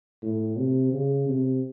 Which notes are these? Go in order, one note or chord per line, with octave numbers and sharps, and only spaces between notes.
A2
C3
C#3
C3